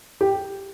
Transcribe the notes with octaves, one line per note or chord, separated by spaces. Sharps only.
G4